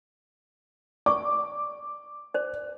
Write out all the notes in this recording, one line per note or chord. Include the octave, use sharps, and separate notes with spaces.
D5 C#6 D6
C5 D5